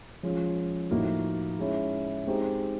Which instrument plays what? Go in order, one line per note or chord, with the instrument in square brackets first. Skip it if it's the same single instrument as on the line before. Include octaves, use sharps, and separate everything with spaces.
[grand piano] F3 G#3 C#4 F4
A2 F3 A#3 D#4 F#4
G#3 C#4 E4
G#3 C4 D#4 G4 C5